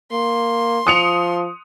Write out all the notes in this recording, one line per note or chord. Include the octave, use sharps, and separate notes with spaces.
A#3 C6
F3 D#6 C#7 F7